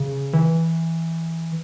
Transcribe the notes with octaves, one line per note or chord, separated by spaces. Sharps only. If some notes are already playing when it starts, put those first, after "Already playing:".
Already playing: C#3
E3